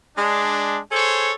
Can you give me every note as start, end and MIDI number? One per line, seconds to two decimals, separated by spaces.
0.17 0.78 56
0.17 0.78 62
0.91 1.32 68
0.91 1.32 69
0.91 1.32 72
0.91 1.32 73